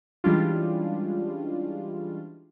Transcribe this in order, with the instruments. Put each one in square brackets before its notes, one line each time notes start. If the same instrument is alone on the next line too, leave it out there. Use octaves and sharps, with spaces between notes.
[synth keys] E3 G3 G#3 C#4 D4 F4